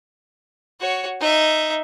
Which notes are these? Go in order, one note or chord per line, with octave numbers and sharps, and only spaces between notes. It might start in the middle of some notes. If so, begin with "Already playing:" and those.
F#4 C#5
D#4 E5